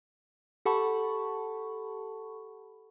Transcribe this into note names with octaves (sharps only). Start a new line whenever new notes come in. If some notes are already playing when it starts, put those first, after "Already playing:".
G4 A4 F#5 A5 B5 C#6